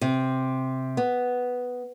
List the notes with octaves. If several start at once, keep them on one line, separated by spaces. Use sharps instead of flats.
C3
B3